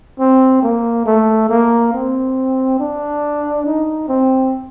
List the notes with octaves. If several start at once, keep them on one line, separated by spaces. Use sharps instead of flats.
C4
A#3
A3
A#3
C4
D4
D#4
C4